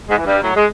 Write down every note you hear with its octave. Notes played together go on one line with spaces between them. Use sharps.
G#2 G#3
E3
G2 G3
A2 F#3
G#3